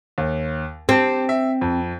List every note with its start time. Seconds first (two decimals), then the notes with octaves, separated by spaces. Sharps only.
0.18 D#2
0.89 C4 G4 A5
1.29 E5
1.61 F2